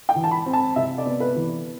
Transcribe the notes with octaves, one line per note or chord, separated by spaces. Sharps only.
G5
E3
A5
B5
C4
A5
C3 E5
D5
B3
B4
E3